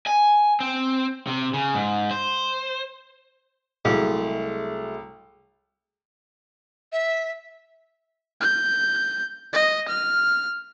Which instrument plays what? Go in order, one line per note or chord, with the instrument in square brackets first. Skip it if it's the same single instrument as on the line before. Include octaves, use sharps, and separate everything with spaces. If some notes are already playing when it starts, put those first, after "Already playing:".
[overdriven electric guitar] G#5
C4
C3
C#3
G#2
C5
[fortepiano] C2 [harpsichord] F#3 G#3 A3 [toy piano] G#4 F5
[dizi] E5
[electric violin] G6
D#5
F6